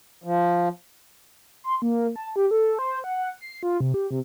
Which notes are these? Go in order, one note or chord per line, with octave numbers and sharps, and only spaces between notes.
F3
C6
A#3
A5
G4
A4
C5
F#5
C7
F4
C3
G4
C3